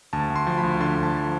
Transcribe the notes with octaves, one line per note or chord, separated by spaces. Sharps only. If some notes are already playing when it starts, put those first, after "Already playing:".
D2 A5
D2
C6
F3
B5
D2
D3 C6
D2
A5
F3